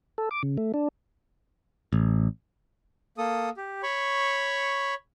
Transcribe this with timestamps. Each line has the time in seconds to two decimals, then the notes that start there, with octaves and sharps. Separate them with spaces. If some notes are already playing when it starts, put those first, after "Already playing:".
0.18 A4
0.31 D6
0.43 C#3
0.58 A3
0.74 D4
1.93 A1
3.18 A#3 A4 D#6
3.57 G4
3.83 C#5 B5 C#6